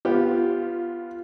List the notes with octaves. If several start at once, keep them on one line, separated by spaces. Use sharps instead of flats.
B3 F4 G4